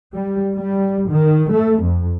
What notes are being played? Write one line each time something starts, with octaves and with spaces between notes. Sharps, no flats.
G3
G3
D#3
A3
F2